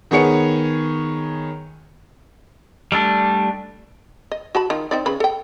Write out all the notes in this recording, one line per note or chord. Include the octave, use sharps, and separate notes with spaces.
D#3 B3 G#4 C#5 C#7
G3 A3 D4
D#5
F#4 A5 B5
D#3 F4
C4 D#4 D5
C#3 B4 B5
A4 G5